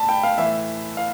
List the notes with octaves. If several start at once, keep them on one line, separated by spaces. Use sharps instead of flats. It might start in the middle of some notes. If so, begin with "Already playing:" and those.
Already playing: A2 A5 B5
G5
F5
A2 E3 E5
F5